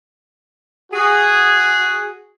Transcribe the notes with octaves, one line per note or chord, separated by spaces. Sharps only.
F#4 G#4